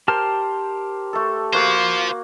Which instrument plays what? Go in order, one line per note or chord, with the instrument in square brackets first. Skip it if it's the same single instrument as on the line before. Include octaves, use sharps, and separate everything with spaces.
[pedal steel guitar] G4 A5 F6 [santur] A#4 C5
[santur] A3 A4
[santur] A#3 F#4 [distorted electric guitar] F4 C5